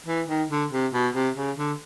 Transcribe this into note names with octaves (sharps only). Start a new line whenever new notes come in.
E3
D#3
D3
C3
B2
C3
C#3
D3